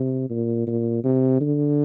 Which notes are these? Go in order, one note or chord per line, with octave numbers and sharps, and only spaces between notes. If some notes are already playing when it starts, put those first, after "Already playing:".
Already playing: C3
A#2
A#2
C3
D3